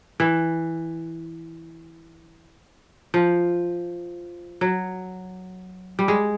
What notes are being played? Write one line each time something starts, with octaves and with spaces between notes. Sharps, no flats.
E3
F3
F#3
G3
G#3